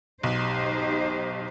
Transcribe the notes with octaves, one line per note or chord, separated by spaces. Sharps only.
B1 D#4 G4 C5